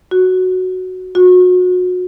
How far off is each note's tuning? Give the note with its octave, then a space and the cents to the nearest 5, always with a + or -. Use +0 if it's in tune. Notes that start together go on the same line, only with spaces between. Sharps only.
F#4 +0
F#4 -30